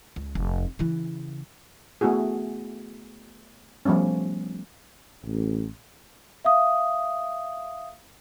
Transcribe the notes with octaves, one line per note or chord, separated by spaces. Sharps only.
C#2
F1
C#3 E3
A3 B3 E4 F#4 G#4
F3 G3 A3 B3 C#4
A1
E5 F5 D#6